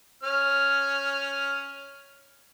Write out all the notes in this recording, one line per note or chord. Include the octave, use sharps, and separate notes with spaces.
C#4 F6